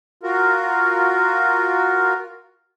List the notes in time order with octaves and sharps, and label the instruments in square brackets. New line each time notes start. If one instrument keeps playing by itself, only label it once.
[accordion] F4 F#4 A#4